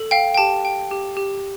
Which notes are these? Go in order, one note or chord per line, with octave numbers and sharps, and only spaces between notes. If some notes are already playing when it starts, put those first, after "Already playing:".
Already playing: A4
F5 G5
G5
G4 A5
G5
G4
G4